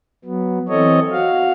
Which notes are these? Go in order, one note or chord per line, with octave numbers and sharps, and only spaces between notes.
F#3 B3
E3 C4 A4 C#5 D#5
F#4 F5